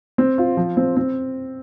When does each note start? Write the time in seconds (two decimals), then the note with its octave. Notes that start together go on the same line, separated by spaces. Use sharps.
0.18 C4
0.38 F4
0.57 F3
0.77 C4
0.97 C4